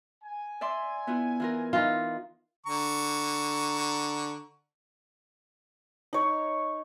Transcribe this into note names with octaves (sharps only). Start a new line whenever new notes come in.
G#5
D5 E5 C6
B3 E4 F4
E3 F4 A#4
E3 D#4 F4
D3 A#5 C#6
D#4 C#5